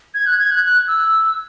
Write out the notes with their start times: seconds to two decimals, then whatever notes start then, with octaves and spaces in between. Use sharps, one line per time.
0.14 G#6
0.27 F#6
0.40 G#6
0.51 F#6
0.64 F#6
0.88 E6